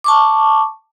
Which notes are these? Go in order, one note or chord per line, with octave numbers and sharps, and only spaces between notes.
A5 C#6 D6